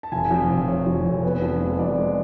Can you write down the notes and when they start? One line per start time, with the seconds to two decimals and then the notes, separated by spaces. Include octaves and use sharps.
0.03 A5
0.12 F1 G#5
0.31 F2
0.49 F1
0.67 F1 C#5
0.87 F2
1.05 F1
1.23 B3
1.42 F2
1.60 G#3
1.79 F2 D5
1.98 G#3